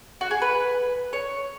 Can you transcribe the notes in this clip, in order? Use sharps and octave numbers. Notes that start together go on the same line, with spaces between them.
F#4
G#4
B4
C#5